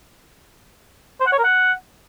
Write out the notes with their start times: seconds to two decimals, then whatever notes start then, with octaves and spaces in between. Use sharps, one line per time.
1.21 C5
1.26 F#5
1.32 C#5
1.38 A#4
1.44 F#5